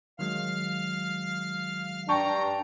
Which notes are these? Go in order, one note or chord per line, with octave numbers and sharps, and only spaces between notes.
D#3 F#3 G#3 F5 F6
G2 D4 G5 A5 A#5 C#6